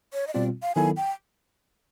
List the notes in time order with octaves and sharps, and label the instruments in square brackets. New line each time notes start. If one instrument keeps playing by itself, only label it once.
[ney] C#5
D#5
[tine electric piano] B2 G3 C4 F4 [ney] D5
[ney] F5
[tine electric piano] D#3 F#3 B3 E4 A4 [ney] G#5
[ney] G5